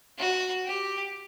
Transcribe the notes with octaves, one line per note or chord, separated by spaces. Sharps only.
F#4
G4